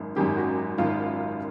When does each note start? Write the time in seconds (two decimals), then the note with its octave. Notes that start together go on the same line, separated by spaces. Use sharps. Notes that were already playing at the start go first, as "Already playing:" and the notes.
Already playing: G#1 F#2 D#3
0.16 G#1 F#2 D#3 G4
0.37 F#4
0.78 G#1 F#2 D#3 F4